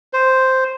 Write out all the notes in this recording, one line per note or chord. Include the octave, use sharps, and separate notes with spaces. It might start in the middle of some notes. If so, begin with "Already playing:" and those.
C5